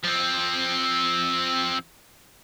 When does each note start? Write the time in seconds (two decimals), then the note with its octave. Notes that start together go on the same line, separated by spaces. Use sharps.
0.04 F3 C4